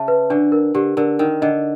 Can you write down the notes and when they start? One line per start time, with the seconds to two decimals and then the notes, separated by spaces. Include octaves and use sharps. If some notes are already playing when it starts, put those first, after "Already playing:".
Already playing: C#3 E5 A5
0.08 B4
0.30 D3 D4
0.52 A#4
0.75 D3 G4
0.97 D3 A#4
1.19 D#3 A#4
1.42 D3 D#5